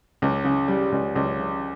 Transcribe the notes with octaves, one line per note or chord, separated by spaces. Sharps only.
C#2
C#3
G3
C#2
C#2
C#3